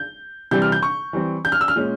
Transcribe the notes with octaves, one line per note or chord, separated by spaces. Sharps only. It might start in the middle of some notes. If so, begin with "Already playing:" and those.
Already playing: G6
C3 E3 G3 C4 G6
F6
G6
C#6
E3 G3 C4
G6
F6
E6
F6
A#2 G#3 C#4